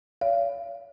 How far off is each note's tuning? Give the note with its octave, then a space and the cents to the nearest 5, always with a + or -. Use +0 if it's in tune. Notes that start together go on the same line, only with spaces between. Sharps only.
C#5 +45 F5 -30